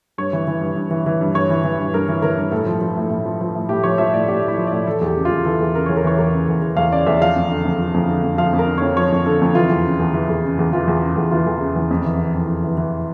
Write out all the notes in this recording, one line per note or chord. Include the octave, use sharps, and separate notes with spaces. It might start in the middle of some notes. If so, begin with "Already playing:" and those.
G2 C#5
E3
E3
G2
G2
E3
E3
G2
G2 C#5
E3
E3
G2
G2 A#4
E3
E3 A#4
G2
A2 A4
F3
F3
A2
A2
F3
F3
A2
A2 G4
F3 C#5
F3 E5
A2 D5
A2 G4
F3 E4
F3
D5
A2
E3 A4
E2 G4
C#3
F4
E2
E3 A4
E2
C#3 A#4
E2 C#5
A#4
E3 C#5
E2 A#4
C#3
E2
E3
E2 F5
C#3 D5
E2 E5
F3 F5
F2
D3
F2
F3
F2
D3
F2
F3 F5
F2
A#4
D3
F2 C#5
F3 C#5
F2
D3 A4
F2
E3 F4
E2
C#3
E2
E3
E2
C#3
E2
E3 F4
E2
C#3
E2
E3 F4
E2
C#3
E2
F2
E3
E3
F2
F2
E3
E3